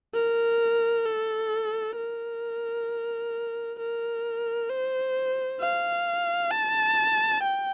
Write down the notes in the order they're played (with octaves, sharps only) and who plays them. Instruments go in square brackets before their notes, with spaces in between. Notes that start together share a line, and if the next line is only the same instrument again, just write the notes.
[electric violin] A#4
A4
A#4
A#4
C5
F5
A5
G5